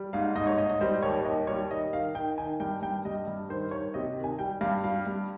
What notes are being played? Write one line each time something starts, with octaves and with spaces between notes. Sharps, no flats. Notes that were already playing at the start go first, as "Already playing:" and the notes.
Already playing: G3
G#2 F5
G#2 D#5
C#5
G#2 D#5
D#5
G3 C5
D#2 C#5
D#2 D#5
G3 C#5
D#3 D#5
D#3 F5
D#3 G5
D#3 G#5
G2 G5
G2 G5
G2 D#5
G2
D#3 C5
D#3 C#5
C3 D#5
D#3
G#5
G3 G5
G2 F5
G3 F5
G2